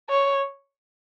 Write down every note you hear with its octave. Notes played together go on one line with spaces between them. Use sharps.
C#5